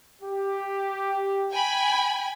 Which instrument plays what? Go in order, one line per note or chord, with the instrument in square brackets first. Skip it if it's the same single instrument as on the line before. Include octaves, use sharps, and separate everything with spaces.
[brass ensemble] G4
[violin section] G5 G#5 B5